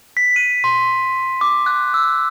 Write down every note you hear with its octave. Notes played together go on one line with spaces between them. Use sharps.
B6
D#7
C6
D6
F#6
E6